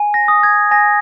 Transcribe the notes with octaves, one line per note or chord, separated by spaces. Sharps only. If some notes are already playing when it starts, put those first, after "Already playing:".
Already playing: G#5
A#6
D#6
G#6
G#5 A#6